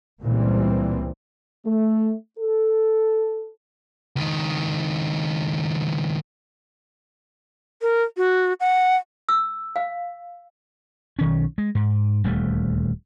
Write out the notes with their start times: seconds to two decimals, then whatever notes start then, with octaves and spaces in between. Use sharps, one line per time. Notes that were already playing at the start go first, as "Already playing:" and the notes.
0.21 C#2 A#2 E3 G3 C4
1.66 A3
2.39 A4
4.16 C#2 D#3
7.82 A#4
8.17 F#4
8.60 F#5
9.29 E6
9.76 F5
11.19 B1 D#3 C#4
11.58 G#3
11.75 G#2
12.24 D#1 D2 G3 A3